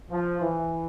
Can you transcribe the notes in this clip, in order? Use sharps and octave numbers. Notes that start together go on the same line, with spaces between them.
F3
E3